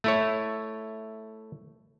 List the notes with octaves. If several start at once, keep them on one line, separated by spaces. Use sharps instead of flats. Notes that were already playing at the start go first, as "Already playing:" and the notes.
A3 E4 C#5